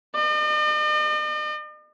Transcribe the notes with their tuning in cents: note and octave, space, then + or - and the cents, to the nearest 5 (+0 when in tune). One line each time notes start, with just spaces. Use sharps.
D#5 -45